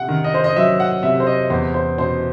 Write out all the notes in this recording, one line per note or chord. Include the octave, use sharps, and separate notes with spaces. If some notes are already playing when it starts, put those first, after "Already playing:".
Already playing: C3 F#5
D#3
D#5
C5
D#5
F#3 E5
F#5
C3 E5
C5
D#5
E2 C5
C5
B2 C5